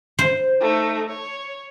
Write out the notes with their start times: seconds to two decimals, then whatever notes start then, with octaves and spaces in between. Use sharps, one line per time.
0.19 C5
0.61 A3 D#4
1.09 C#5